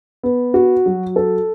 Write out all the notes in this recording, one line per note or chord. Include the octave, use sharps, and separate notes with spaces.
B3
F#4
F#3
A4